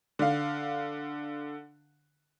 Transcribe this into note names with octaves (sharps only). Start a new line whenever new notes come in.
D3 F5